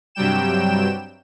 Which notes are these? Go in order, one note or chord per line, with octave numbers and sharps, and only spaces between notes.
G2 C3 F#3 G3 G5 E7